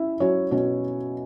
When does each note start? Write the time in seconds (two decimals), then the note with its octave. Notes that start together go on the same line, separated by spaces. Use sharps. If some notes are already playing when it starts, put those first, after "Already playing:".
Already playing: C#4 E4 E5
0.20 F#3 C#4 C#5
0.51 B2 C#4 C#5